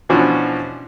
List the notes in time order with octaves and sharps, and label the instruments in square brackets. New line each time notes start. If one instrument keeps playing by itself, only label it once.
[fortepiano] B2 E3 F3 C#4 D4 F#4